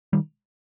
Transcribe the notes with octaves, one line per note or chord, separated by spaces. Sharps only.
D#3 G3